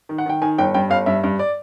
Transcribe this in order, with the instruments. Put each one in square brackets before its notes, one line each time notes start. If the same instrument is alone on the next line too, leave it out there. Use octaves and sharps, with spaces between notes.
[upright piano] D#3
F#5
D#3 G5
D#3 G#5
G1 G5
G2 G5
G1 F5
G2 E5
G2
D5